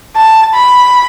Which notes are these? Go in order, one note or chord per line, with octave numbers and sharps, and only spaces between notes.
A5
B5